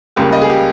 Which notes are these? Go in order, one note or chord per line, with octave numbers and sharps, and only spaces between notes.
C#2 C#3 G3 A#3 G4
D#5
G#4
G4